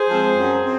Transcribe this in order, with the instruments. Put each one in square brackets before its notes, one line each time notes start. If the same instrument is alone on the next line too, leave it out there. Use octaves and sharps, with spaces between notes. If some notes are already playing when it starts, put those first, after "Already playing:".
Already playing: [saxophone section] G#4 C5
F3 G#3 C4
F#2
C4